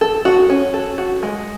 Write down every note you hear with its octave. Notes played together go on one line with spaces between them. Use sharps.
A4
F#4
C#4
A4
F#4
G#3